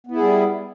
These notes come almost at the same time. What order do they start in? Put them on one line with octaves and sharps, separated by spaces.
B3 E4 G#4 G3